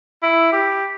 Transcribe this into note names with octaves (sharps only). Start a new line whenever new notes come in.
E4
G4